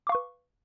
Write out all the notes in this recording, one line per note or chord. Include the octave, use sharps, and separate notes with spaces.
B4 F5 C#6 D6